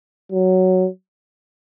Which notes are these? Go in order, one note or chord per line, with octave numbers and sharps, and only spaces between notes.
F#3